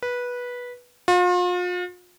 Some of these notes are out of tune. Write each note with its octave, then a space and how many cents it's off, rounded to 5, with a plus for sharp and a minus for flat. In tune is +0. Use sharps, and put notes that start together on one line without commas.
B4 -15
F4 +40